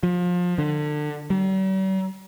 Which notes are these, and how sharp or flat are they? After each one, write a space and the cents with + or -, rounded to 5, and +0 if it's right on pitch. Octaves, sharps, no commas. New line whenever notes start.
F3 +25
D3 +30
G3 -45